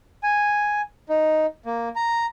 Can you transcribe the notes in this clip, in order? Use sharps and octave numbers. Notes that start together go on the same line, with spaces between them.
G#5
D#4
A#3
A#5